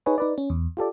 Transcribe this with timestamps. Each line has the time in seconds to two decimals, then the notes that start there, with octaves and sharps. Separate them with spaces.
0.06 D#4 G#4 B4 C#5 G#5
0.18 D#4 B4 D5
0.38 C#4
0.50 E2
0.77 F4 G4 A4 D5